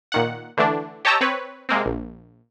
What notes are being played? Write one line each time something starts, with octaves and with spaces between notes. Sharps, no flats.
A#2 D#3 F#5
D3 E3 A3 D4
G4 C#5 D#5 A5 A#5 E6
C4 B4 C#5
C3 G#3 A#3 C4
A#1